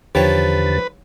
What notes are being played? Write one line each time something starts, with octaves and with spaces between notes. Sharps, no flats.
E2 D3 D#3 F3 G4 B4 C#5 A6